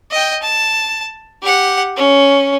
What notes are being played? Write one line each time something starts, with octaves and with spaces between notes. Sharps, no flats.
D#5 G5
A5
G4 F#5
C#4